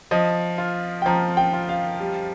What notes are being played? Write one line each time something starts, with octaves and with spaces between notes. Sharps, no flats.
F3 D#5
F4
G5
F3 A#5
G5
F4
F5
G3